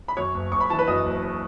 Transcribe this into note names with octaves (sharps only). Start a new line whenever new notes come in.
B5
F#2 C#5 C#6
F#1
F#1 C#6
B5
E3 A5
B4 B5
F#2 D#5 D#6
F#1